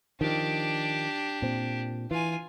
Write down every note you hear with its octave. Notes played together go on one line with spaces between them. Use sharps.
D#3 F3 D4 G4
A#2 C4
E3 F4 G#5